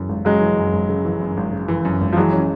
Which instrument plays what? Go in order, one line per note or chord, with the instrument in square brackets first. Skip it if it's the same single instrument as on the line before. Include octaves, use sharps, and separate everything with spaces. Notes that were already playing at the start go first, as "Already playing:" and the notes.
Already playing: [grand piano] F#2 C#3 E3
G#1
[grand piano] C#3 [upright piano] F#3 G#3
[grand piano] E3
F#2
G#1
C#3
E3
F#2
G#1
C#3
E3
F#2
G#1
[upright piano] F3
[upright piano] E3 F#3 [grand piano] G#3
[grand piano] C#4